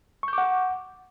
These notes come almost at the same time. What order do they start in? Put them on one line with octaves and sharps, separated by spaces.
C#6 G6 D6 F#5